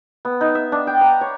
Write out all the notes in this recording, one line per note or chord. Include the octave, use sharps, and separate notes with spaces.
B3
D#4
E5
D4
G5
A#5
C#5